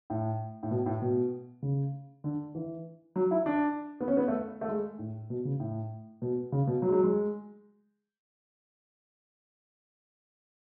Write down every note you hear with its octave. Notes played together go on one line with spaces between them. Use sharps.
A2
A2
B2
A2
B2
C#3
D3
E3
F#3
E4
D4
B3
C#4
B3
A3
A3
G#3
A2
B2
C#3
A2
B2
C#3
B2
F#3
G#3
F#3
G#3